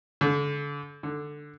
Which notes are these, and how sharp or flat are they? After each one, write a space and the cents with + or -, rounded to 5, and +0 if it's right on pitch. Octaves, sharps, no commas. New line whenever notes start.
D3 -35
D3 +5